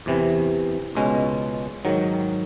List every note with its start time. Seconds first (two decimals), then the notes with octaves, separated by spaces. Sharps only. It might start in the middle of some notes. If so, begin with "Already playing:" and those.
0.06 E2 C3 E3
0.95 C#2 B2 G#3 C#4
1.85 G#2 D#3 F#3